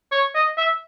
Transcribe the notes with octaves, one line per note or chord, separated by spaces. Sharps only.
C#5
D#5
E5